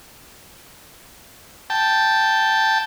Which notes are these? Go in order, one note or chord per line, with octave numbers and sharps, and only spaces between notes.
G5 A5